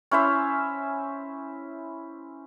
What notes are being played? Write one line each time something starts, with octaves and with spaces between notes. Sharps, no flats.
C#4 E4 C5 E5